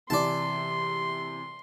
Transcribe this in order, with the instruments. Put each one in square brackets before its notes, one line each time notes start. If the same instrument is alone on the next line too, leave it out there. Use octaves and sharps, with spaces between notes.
[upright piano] C3 E3 [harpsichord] D5 A5 [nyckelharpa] C6